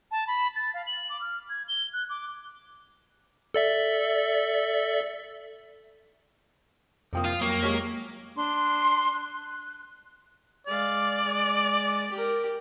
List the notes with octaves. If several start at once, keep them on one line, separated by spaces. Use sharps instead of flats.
A5
B5
A6
F5
F#7
D6
F6
G#6
G7
F#6
D6
A4 D5 E5
F2 C3 F3 A#3 G5 D#6
F4
F#3 A#3
F#3 G#3 G4 C#5 F6 B6
D4 C6
F#6
G#3 D5 F5
G#3 D6
G4 A#4